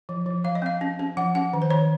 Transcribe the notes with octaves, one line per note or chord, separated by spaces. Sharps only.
F3
F3
F3 F5
D#5
C4 F5
C#4
C#4
F3 F#5
C#4 F#5
D#3
C5
D#3 C#5